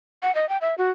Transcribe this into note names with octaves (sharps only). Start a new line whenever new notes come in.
F#5
D#5
G5
E5
F#4